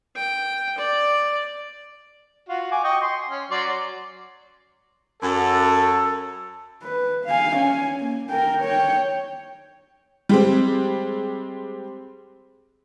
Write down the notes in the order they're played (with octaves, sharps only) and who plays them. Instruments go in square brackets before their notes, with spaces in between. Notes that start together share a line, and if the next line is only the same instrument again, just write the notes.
[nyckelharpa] G5
D5
[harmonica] F4 F#4
G#5 D6
D#5 G5 C#6
C6
C#4
F#3 D5 C6
[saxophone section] F#2 [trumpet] A4
[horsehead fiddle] B4
F5 G#5
C#4 G#5
A#3
A#4 G5
C#5 G5
[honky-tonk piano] G3 G#3 C4